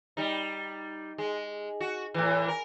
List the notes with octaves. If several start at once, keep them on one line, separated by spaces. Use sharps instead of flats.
G3 D#4
G#3
F#4
A2 E3
A#4